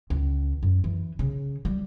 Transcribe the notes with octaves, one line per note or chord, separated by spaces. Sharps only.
C#2
F#2
E3
C#3
G3